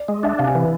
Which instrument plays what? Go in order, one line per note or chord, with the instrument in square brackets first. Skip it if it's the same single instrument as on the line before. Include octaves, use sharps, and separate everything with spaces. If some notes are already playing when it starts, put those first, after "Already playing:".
Already playing: [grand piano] D5
[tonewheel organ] G#3
[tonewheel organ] D4 [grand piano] E5
[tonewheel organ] C3 [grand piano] F5
[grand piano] G#5
[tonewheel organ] E3